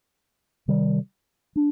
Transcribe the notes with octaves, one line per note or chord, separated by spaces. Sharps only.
C3 D#3 G3
D4